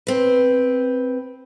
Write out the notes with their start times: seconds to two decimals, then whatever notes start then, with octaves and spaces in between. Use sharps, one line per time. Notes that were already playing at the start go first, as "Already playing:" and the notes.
0.07 C4 B4